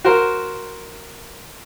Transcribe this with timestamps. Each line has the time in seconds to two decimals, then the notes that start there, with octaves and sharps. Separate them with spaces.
0.04 F#4 A#4 C5